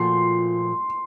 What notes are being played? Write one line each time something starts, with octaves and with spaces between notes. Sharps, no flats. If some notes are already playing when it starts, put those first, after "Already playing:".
Already playing: A#2 F3 A3 F#4 C6